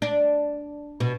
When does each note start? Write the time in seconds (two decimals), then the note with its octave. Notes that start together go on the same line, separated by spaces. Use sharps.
0.02 D4
1.00 B2